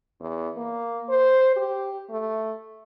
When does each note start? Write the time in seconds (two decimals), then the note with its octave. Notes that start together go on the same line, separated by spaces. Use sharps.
0.21 E2
0.57 A#3
1.09 C5
1.57 G4
2.10 A3